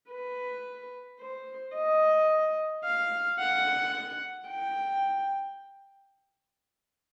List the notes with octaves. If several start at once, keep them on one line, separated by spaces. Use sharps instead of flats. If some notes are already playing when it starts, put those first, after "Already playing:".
B4
C5
D#5
F5
F#5
G5